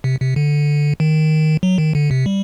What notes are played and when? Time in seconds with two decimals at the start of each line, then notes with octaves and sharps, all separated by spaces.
0.04 C3
0.20 C3
0.36 D3
1.00 D#3
1.63 F#3
1.78 D#3
1.95 D3
2.11 C3
2.26 G3